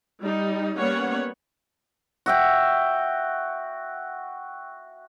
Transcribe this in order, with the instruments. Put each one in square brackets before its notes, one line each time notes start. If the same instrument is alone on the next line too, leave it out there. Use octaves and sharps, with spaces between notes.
[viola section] G3 D#4
G3 A#3 B3 C#4 C#5 F#5
[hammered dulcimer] F#4 E5 G5